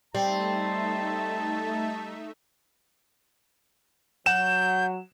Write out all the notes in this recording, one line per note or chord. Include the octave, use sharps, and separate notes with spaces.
G3 A3 C4 D#4 E5 A5
F#3 F#5 G6 E7